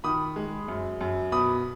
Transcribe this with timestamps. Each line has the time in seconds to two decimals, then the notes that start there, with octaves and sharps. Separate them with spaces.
0.04 D#3 B5 D#6
0.36 G#3
0.68 F#2
1.01 F#2
1.32 B2 B5 D#6